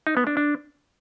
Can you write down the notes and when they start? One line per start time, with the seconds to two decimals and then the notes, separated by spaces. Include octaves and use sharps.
0.07 D#4
0.17 B3
0.27 D4
0.37 D4